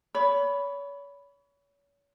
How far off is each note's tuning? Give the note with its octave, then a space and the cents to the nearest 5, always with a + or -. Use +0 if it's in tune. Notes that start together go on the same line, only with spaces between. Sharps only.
C#5 +35 B5 +0